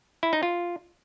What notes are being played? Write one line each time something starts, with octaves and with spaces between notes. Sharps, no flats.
E4
D#4
F4